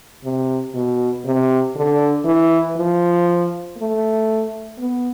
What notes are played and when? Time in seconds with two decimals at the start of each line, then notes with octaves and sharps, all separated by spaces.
0.24 C3
0.74 B2
1.25 C3
1.76 D3
2.25 E3
2.77 F3
3.78 A3
4.78 B3